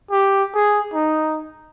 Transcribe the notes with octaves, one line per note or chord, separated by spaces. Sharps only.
G4
G#4
D#4